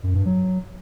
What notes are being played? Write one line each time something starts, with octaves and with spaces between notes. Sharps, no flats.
F#2
G2
F#3